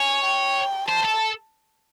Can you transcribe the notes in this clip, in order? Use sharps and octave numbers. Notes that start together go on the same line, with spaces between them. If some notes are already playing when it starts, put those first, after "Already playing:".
Already playing: C#5 G#5
G5
C5 A5
A4